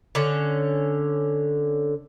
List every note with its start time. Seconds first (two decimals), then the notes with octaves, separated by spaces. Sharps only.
0.15 D3 C#4